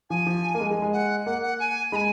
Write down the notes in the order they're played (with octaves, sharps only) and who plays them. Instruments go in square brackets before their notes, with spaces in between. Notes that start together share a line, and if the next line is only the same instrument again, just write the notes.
[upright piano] F3 [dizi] G#5
[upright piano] F3
A#3
G#3
G#3
G#3
[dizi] F#5
[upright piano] A#3 [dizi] F#5
[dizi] F#5
G#5
[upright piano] G#3 [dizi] G#5 B5